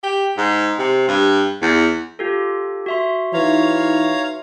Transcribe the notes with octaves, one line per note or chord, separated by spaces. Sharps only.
G4
G#2
C3
G2
E2
F4 G4 A4
F#4 E5 C6
E3 D#4 B4 C#5 F5 A#5